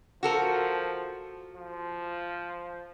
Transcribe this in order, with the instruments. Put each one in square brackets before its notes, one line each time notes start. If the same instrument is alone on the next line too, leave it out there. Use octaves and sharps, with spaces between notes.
[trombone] F3 [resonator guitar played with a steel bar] F#4 A4 A#4
[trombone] F3